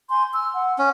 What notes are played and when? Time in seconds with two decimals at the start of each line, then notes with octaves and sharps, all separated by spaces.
0.10 G#5 C6 G6
0.32 E6 F6
0.54 F#5
0.78 C#4